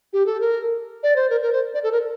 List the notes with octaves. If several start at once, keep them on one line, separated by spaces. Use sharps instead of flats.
G4
A4
A#4
D5
C5
A#4
A#4
C5
D5
A4
A#4